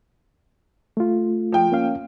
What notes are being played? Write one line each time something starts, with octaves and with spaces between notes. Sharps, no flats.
A3 F4
F3 G5
A#3 C#4 F5